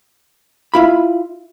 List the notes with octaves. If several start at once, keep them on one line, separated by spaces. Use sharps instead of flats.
E4 F4 B5